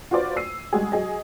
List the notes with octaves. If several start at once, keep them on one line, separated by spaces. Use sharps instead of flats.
F4 F#4 B4 C5 D5
E6 C7 D#7
G3 G#3 F#4 G#4
F#3 G#4 D#5